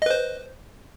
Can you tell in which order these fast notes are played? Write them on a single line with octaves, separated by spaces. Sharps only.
D#5 B4 C5